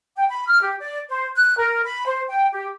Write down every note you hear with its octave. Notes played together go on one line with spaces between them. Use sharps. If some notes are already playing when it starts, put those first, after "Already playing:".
G5
B5
F6
G4
D5
C5
F#6
A#4
B5
C5
G5
G4